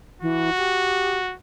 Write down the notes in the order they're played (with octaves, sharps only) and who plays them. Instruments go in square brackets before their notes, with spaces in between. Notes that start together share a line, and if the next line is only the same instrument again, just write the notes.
[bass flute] E3 [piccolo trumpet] F#4
[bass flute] G4